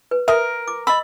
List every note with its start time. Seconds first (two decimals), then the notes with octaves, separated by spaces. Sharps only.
0.11 B4
0.28 A#4 E5 D#6
0.68 D6
0.87 D#5 B5 E6